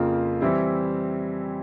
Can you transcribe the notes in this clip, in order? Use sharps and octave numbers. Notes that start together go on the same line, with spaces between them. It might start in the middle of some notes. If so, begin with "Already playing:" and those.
Already playing: F2 C#3 F3 A#3 F4
E3 G3 C4 E4